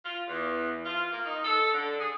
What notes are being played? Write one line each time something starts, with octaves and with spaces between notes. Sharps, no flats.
F4
E2
F4
A#3
D#4
A4
D3
G#4